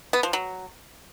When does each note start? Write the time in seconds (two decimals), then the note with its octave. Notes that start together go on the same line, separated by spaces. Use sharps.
0.13 B3
0.23 F3
0.33 F#3